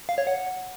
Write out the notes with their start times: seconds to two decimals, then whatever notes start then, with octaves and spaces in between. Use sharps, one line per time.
0.09 F5
0.18 C#5
0.27 F#5